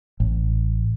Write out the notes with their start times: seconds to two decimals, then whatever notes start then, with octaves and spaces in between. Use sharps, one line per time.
0.20 A1